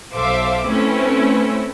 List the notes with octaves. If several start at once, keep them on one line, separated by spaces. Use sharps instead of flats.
B1 A4 C5 E5 F5 D6
A3 C4 C#4 E4 B4